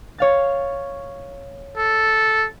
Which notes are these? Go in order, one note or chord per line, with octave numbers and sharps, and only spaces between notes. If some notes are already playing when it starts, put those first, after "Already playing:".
C#5 F5 A6
A4